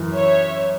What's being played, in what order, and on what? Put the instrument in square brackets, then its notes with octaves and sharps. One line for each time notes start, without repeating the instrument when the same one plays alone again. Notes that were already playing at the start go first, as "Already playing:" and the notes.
Already playing: [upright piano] F#2 E3
[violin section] C#5 E5